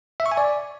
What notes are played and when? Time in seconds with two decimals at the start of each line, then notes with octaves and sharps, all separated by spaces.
0.20 E5
0.26 C#6
0.32 G#5
0.37 D5